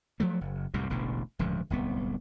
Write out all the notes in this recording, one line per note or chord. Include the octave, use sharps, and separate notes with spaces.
F3 F#3 A3
F#1
C2 F#2 A2 C3
E1 A1 B2 D3
D1 C#2 G2 F3
D1 C2 B3